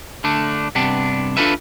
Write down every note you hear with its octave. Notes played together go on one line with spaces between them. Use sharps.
D3 A3 D4
G2 C3 B3 D4
D4 F4 A4 B4 E5